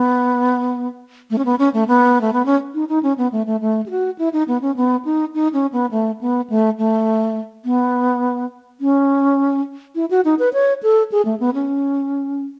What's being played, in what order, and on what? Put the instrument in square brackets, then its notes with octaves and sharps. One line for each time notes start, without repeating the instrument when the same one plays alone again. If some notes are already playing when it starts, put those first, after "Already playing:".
Already playing: [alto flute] B3
A3
C#4
B3
C#4
A3
B3
A3
B3
C#4
D#4
D#4
C#4
B3
A3
A3
A3
G#4
F#4
E4
D#4
B3
C#4
B3
D#4
D#4
C#4
B3
A3
B3
A3
A3
B3
C#4
E4
F#4
D#4
B4
C#5
A4
G#4
A3
B3
C#4